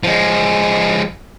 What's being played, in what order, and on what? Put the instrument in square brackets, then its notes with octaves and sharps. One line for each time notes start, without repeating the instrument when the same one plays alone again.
[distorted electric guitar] F3 G#3